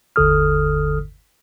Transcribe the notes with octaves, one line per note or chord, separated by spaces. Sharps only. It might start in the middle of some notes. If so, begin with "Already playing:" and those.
G1 D#2 D3 A4 D#6 F6